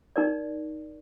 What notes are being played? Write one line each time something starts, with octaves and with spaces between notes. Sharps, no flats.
D#4 A#4 D5